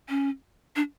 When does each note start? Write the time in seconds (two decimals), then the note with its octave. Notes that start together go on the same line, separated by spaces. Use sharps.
0.09 C#4
0.76 D4